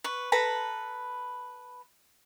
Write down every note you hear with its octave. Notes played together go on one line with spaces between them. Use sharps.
B4 C#6
A4 B4 A#5 B5